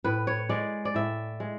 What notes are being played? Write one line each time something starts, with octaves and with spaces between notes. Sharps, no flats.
A2 B4
C#5
G#3 D5
D5
A2 E5
G#3